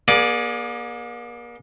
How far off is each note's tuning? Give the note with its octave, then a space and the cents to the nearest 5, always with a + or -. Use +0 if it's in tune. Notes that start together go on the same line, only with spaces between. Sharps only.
A#3 +40 G#4 +0 D5 +0